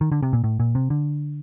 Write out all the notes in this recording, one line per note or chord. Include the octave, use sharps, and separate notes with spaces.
D#3
D3
C3
A#2
A2
A#2
C3
D3